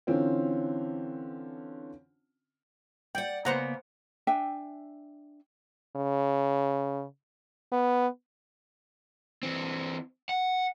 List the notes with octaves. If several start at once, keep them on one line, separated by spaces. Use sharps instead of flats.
D3 E3 C4 C#4 F4
D5 F#5 G5
C#3 A#3 B3 C5 F#5 A#5
D4 E5 G5 G#5
C#3
B3
E3 C4
F#5